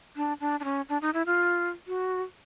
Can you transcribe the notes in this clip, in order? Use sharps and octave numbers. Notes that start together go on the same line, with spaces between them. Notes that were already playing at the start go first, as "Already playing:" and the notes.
D4
D4
D4
C#4
D4
D#4
E4
F4
F#4